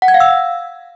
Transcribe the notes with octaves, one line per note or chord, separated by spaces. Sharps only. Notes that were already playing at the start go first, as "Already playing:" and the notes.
F#5
G#6
F5
E6